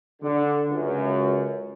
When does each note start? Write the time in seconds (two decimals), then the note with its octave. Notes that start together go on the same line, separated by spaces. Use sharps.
0.22 D3
0.69 C#2 F#2